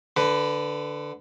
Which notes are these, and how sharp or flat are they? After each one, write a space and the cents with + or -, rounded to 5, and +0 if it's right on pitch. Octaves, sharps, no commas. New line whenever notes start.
D3 +0 B4 +15